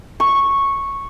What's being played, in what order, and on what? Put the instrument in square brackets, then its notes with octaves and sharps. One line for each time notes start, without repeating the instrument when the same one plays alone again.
[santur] C#6